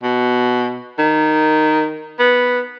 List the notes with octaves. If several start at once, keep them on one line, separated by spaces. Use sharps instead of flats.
B2
D#3
B3